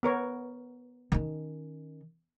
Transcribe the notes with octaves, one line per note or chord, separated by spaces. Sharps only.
B3 A#4 C#5
D#3 C#4